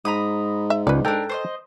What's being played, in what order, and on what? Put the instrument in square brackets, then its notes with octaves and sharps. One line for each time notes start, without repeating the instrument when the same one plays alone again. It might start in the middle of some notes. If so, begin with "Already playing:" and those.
[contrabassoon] G#2 [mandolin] A#5 B5 D#6
[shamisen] E5
[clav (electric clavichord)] C#2 [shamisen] B4 D5
[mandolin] D4 A#4 [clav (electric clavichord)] A4 G5
[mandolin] C5 C#5 D#5